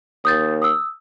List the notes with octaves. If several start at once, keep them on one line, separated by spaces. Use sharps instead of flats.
D#2 D#6 G6 A6
D#6 E6